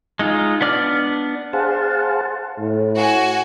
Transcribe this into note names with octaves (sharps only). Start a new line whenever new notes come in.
G#3 D#4 F4
B3 D4 D5 D6 F6
G#4 C5 F5 F#5 A5
A2
F#4 G#5